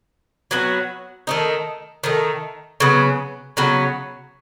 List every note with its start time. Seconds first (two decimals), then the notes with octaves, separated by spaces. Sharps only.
0.51 F#3 B3 F#4
1.27 D#3 A3 D#4
2.04 D#3 A3 D#4
2.80 C#3 F#3 B3
3.57 C#3 F#3 B3